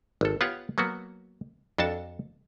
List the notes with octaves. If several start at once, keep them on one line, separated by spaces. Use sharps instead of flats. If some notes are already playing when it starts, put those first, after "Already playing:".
G#1 A4
B3 F4 G4 C#5 F#5
F#3 A#3 B3 F#4
F2 D4 F#4 A4 A5